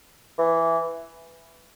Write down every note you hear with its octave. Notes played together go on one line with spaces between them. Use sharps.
E3